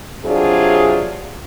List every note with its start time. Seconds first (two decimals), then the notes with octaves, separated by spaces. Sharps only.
0.24 C3 F#3 D4 F4 G#4